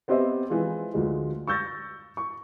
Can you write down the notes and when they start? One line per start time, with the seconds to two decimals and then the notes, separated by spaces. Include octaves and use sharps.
0.08 B3 C4 G4 C5 D#5 E5
0.50 E3 F3 G#3 F4
0.94 D2 F3 G#3
1.47 C#6 E6 G6 A6 A#6
2.17 C#6